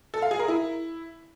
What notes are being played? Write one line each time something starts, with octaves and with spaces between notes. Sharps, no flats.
A4
F5
G#4
A#4
E4